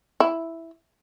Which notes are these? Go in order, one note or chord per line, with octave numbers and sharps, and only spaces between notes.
E4